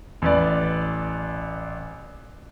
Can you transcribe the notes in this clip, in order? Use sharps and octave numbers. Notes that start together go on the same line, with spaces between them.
A1 B4 D5